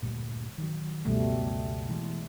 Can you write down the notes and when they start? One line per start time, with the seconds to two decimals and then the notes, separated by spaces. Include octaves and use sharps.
0.02 D2 G2 A#2
0.58 D#3 F#3
1.05 C#2 F#2 B2 G3 A3
1.89 E3 F#3 G#3